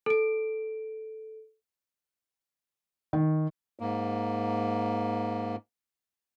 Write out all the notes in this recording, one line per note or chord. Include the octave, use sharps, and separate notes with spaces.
A4 D7
D#3
G#2 A#3